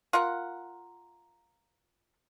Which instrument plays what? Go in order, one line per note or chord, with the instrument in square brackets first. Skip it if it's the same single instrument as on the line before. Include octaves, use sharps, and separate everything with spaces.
[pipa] F4 A#4 F#5